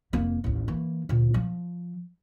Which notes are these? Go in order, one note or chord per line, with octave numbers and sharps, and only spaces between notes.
F1 A#3
A1 D#2
E3 A#3
D2 A#2
F3